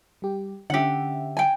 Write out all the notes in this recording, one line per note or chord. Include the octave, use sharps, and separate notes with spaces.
G3 G4
D3 C#4 G4 E5 F#5
G5 G#5